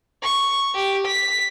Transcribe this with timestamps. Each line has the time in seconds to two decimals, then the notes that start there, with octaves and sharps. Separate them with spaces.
0.23 C#6
0.75 G4
1.07 B6